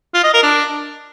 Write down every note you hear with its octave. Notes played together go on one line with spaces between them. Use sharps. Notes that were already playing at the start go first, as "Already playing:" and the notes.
F4
D#5
A#4
D4